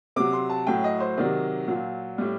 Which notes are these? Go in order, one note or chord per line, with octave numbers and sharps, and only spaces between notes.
C3 F#3 D6
C6
A5
A2 F#3 G5
D#5
C5
C3 D#3 F#3 D5
A#2 F#3
A2 G3